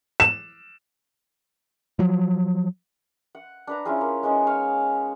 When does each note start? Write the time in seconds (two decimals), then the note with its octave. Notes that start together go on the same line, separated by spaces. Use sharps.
0.20 E7
1.99 F3 F#3
3.35 F#5
3.67 D4 B4 A#5
3.85 C#4 E4 F4 G#4
4.01 A#3
4.23 G#3 B3 C#4 D#4
4.47 C#5 F5 G#5